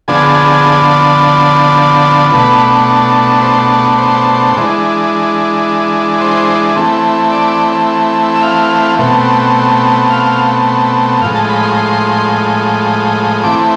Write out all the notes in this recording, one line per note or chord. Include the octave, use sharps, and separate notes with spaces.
D3 F3 B3 D4 G#4
B2 A3 D4 B4
C5
C5
E3 G#3 D4
C5
E3 A3 C4
D5
E5
F5
B2 A3 C4
F5
A2 F3 G#3 F5
A5
B5
C6
C6
E3 A3 C4 D6